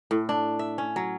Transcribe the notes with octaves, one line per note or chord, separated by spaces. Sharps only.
A2
D4
E5
C#4
F#3